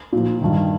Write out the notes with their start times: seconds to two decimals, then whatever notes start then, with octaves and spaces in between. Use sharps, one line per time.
0.13 A#2 F3
0.41 G2 D#3